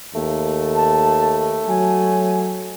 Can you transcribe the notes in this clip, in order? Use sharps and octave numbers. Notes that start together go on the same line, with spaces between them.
D#2 A3
A5
F#3 G#5